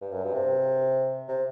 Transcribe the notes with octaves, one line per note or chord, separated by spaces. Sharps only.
G2
F#2
G2
C3
C3